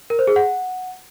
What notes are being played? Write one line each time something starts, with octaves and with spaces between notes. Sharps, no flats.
A#4
C5
G#4
F#5